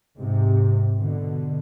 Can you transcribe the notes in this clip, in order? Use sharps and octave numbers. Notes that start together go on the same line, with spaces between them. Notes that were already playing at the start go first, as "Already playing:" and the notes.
G#2 C3
B2 D3